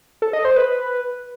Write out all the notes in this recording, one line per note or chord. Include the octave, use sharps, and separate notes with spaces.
A4
D#5
C5
B4